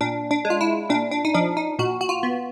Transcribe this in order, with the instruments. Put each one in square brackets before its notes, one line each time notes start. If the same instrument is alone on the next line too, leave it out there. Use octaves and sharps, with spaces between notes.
[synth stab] A#2 D4
D4
G#3
F4
E4
A#2 D4
D4
D#4
F3 D4
D#4
A#2 F#4
F#4
F4
B3